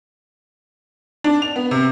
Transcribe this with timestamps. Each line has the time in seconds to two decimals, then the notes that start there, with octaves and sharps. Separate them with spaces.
1.24 D4
1.42 F7
1.56 B3
1.71 C3